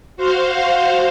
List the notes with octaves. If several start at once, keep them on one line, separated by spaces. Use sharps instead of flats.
F#4 C5 F5